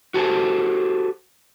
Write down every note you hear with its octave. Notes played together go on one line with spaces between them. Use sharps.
F#4 G4 A4 C5 F5 G#5